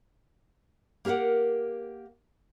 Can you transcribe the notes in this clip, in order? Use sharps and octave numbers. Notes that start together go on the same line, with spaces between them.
A#3 G4 A#4 F5 F#5